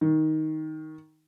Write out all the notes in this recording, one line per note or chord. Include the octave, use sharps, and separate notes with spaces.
D#3